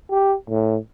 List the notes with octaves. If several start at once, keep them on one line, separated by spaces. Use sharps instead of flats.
G4
A2